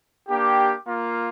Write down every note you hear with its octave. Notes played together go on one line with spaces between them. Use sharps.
A#3 D4 G4
A#3 F4